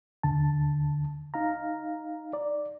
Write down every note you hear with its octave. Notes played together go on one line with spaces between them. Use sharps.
D#2 D3 A5
D#4 F5 A#5
D5